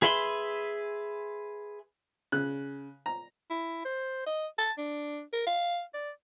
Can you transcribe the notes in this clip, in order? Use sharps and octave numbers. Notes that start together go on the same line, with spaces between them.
G#4 B4 E5 B5 C6
C#3 F#6
A#5
E4
C5
D#5
A5
D4
A#4
F5
D5